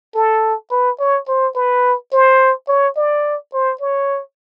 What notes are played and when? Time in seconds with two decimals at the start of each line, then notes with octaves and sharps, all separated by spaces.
0.15 A4
0.71 B4
0.99 C#5
1.28 C5
1.55 B4
2.12 C5
2.68 C#5
2.97 D5
3.53 C5
3.81 C#5